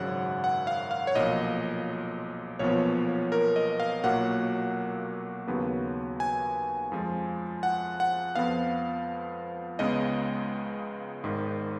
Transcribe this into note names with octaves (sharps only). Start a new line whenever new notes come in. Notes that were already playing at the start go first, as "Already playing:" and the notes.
Already playing: G#1 F#2 C#3 F#3 F#5
F#5
F5
F5
C#5
B1 A#2 F3 D#5
B1 A#2 F3 B3 C#5
A#4
D#5
F5
B1 A#2 F#3 A#3 F#5
D#2 C#3 F#3 B3
G#5
F2 F3 G#3
F#5
F#5
F2 F3 B3 F5
C#2 C#3 G#3 B3 D#5
G#1 G#2 D#3